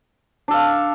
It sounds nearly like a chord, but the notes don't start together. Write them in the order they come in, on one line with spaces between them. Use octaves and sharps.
D4 A4 F5